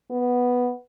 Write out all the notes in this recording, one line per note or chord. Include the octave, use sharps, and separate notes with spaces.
B3